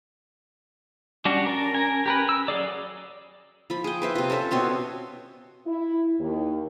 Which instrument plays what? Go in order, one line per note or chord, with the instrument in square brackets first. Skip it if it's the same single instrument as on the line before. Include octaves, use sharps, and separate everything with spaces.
[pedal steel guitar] G3 D4 F#4 [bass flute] C#4
[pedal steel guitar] A#4 A5
A#4 G#5
G4 A#4 B4
E6
F#3 G#4 D5
[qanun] F3 B5
G#4 G5
B4 C5 E5
C3 F4
C#4 A4 C5 E5
B2 C4 C#5 C6
[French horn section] E4
D#2